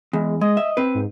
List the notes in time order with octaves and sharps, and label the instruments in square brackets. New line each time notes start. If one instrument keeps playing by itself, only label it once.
[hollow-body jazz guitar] E2 [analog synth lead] G#3
[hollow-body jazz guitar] G#3 [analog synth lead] D#5
[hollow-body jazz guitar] E5
C4 B4
[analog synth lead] G#2